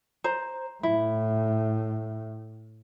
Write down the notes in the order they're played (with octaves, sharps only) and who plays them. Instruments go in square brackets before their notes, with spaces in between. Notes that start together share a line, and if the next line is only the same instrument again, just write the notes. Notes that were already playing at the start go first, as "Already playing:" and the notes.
[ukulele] C5 A#5
[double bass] A2 [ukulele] E4